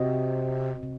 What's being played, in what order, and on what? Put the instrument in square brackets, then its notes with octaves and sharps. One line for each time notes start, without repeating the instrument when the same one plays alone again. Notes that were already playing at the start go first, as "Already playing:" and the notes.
Already playing: [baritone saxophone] C3 [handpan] C4 F#4 C5 D#5
[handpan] C3